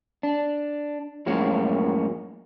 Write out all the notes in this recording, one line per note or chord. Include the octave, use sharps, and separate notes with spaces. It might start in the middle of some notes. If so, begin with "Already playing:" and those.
D4
F#2 A2 F3 G#3 A#3 C#4